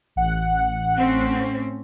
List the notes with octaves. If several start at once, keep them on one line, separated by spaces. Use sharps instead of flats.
A1 F#5
A2 C4 C#4